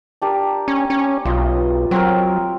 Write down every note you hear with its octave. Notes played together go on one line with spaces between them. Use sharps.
D4 G4 A#4
C#4
C#4
B1 F4 D#5
F#3 C4 A#4